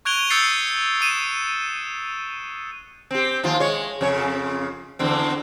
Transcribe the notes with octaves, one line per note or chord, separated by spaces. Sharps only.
C#6 F#6 G#6 D7 F7 G7
D#6 E6 G6 A6 C7 C#7
D#6 D#7 E7
C4 G4
D#2 F3 F4
G#3 C#5
F2 C#3 C#5
E2 D3 C4